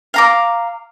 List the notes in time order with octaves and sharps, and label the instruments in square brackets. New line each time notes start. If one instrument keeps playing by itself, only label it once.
[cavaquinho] F5 A#5 D6